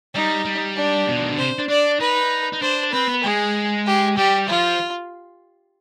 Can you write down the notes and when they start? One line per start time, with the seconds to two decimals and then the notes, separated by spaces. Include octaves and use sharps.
0.14 G3 D#4
0.45 G3
0.76 D4
1.08 B2
1.16 F3
1.23 D#3
1.31 D3
1.38 C3 C5
1.58 D4
1.69 D4 D5
2.00 D#4 B4
2.53 D#4
2.62 D4 C5
2.92 C4 B4
3.09 B3
3.24 G#3 G#4
3.86 G4
4.17 G3 G4
4.48 F3 F4